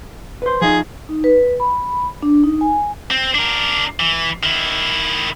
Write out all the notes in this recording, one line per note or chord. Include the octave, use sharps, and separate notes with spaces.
B4 C5
F3 D#4 G#4
D#4
B4
B5
D4
D#4
G#5
C4
D4 A#4
E3
D#3 E4